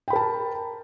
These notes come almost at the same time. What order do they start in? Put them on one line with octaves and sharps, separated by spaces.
G5 B5 A#4 A5